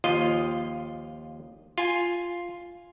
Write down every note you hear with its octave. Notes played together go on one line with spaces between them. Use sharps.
D#2 F3 F4 D#5
F4 G#5